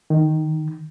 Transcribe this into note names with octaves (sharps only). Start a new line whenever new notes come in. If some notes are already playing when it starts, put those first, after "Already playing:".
D#3